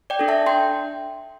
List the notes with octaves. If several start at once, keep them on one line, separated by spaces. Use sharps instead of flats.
D5 G5
D4 A4
E5 A5
D4 G5 C6